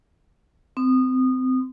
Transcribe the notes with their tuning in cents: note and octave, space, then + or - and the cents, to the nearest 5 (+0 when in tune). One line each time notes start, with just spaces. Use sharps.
C4 -25 D#6 -25